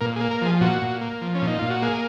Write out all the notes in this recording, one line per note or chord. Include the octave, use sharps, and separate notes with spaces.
A#2 A#4
G#4
A#3
A#4
F3 G#4
A#2 F#4
A#2
A#3
F3
C#4
A#2
D#4
A#2 F4
F#4
A#3 G#4